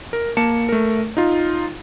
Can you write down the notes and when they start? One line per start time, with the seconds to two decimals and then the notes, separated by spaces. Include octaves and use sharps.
0.13 A#4
0.37 A#3 A5 C#7 E7
0.69 A3 A#4
1.17 D#4 F4